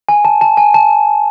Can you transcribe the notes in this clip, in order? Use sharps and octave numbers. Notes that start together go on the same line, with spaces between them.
G#5
A5
A5
G#5
A5